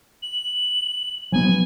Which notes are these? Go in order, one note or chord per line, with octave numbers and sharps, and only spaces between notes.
F#7
F3 F#3 B3 G#5